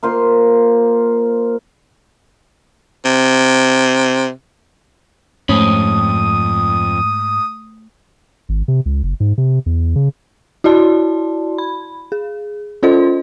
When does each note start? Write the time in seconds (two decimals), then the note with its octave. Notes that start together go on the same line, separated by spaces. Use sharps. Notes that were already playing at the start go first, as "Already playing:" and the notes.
0.03 A#3 F4 C5
3.05 C3
5.49 F2 G#2 A3 C#4 C5 B5 D#6
8.49 G#1
8.68 C3
8.86 C#2
9.03 F#1
9.20 G#2
9.38 C3
9.66 E2
9.96 C#3
10.64 E4 F#4 D5 A5 C6
11.58 B5
12.12 G#4
12.83 C#4 F4 A4 C5 D#5 C6